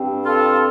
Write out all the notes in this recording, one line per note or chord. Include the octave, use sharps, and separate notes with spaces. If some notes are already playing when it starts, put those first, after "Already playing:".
Already playing: G2 G3 C4
F4 A4